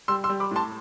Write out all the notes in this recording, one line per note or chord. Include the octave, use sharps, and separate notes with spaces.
G3 C6 E6
C6 E6
G3
B5 D6
A2 A5 C6